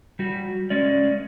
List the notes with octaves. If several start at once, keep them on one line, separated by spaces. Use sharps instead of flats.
G3 F#4
G#3 C#4 D5